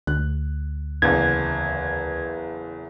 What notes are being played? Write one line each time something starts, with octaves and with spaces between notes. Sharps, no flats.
D2 F#6
F#1 E2 G#6